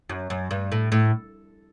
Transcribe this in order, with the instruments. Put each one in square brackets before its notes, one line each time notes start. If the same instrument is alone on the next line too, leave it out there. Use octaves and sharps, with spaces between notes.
[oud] F#2
F#2
G2
A2
A2